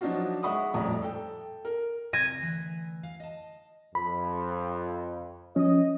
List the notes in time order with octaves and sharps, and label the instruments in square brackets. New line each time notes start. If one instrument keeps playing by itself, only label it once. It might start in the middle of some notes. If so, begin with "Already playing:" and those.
[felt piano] F3 F#3 D4 D#4 F4 F#4
G#3 E5 F#5 B5 C#6 D#6
D#1 F2 A2 D5 A#5 D#6
A4 G5
A#4
[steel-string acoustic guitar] C3 [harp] G#6 A#6 D#7
[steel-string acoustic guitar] D2 E3
F5
D#5 A5
[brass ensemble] F2 [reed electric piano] B5
[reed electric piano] F3 C#4 [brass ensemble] D#5